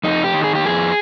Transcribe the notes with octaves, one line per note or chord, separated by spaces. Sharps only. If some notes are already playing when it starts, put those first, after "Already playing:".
F2 D#4
G4
D#3
G#4
G4
F2 G#4